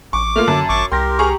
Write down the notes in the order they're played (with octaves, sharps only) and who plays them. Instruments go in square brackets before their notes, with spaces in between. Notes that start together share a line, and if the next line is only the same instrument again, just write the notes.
[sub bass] A1 [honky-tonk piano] C#6 [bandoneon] D6
[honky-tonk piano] A3 A#3 F4 [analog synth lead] F6
[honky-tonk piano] F#2 [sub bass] D3 [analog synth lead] A5
[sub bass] G#1 [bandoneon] C#6 D6
[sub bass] C2 [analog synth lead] G4 [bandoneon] A#4 [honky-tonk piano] C6 A#6
[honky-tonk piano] G#4 A#5 C#6